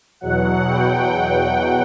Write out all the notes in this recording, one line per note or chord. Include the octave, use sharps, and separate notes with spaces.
E2 B2 F#3 F#5
G5
G5